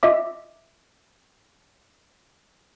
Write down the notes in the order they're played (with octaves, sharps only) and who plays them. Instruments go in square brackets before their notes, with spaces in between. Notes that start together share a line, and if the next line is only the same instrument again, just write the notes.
[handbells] F4 D#5 E5 D6